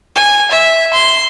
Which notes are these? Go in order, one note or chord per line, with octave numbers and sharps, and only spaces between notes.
G#5
E5
C6